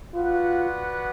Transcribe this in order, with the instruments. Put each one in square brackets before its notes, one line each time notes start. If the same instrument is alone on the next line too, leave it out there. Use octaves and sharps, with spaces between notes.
[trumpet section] B3 F#4 B4 D5 F#5 [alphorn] F4